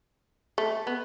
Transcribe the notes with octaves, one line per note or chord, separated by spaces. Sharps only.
A3
B3